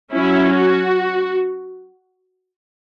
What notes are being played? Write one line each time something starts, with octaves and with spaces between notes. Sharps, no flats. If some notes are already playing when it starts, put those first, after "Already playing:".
F#3 C#4 E4
F#4